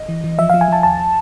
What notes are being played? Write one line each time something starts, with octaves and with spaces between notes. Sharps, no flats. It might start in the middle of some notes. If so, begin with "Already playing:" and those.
Already playing: D#5
E3
E3
F3 E5
F3 F5
G#5
F3 A5
D#2 A5